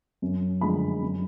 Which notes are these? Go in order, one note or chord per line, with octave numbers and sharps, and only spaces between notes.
F#2
D3 F3 G#3 B5
F#2